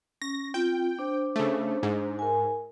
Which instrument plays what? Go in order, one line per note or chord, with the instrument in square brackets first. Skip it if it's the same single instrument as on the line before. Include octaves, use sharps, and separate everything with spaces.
[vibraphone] C#4 [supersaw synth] A#6
[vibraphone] C4 F4 [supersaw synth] G5
[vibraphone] D4 C5
[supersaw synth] C#3 A3
G#2
[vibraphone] A#4 G#5